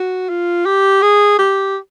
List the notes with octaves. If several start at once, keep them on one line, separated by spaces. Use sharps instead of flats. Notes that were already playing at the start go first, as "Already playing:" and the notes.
Already playing: F#4
F4
G4
G#4
G4